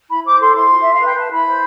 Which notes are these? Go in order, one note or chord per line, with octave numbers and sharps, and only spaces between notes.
E4 B5
C5 D6
A4 C6
E4 C6
F4
F4 E5
F5
B4
G5
B4 A5
E4 B5
C5